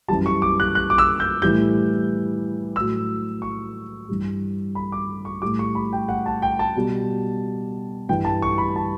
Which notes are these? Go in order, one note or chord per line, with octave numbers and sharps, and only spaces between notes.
F#2 E3 G3 A5
C#6
D6
F#6
F#6
D6
E6
G6
A2 E3 G3 G6
A2 F#3 E6
C#6
G2 E3 G3
B5
D6
C#6
A2 G3 D6
C#6
B5
G5
F#5
A5
G5
A5
B2 G3
G2 E3 G3 G5
A5
C#6
B5
A5